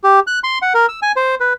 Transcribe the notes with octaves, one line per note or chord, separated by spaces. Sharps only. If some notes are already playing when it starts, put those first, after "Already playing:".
G4
F#6
C6
F#5
A#4
E6
G#5
C5
B4